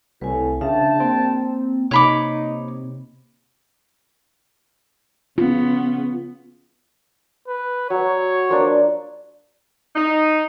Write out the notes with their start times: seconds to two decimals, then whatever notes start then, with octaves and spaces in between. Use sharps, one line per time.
0.21 C2 A2 B4 G#5
0.61 A#1 C#3 D4 E5 F5 G5 A5
1.00 A#3 C4
1.91 C3 D#4 C#5 B5 D6
5.38 C#3 B3 C#4 F4
7.48 B4
7.90 F#3 C#5
8.49 F3 A#3 D4
9.96 D#4